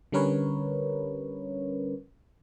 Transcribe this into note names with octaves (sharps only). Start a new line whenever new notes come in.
D3 G3 C#4 A#4 B4 C#5